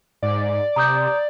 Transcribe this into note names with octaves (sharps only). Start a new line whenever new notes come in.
G#2 D5
C3 A#5 D#6 G6